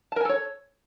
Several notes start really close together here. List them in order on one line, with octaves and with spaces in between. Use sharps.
A5 A#4 G#5 A4 C#5